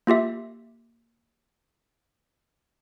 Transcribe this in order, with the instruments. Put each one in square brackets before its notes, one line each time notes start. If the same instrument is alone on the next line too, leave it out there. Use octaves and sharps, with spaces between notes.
[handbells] A#3 F4 G4 E5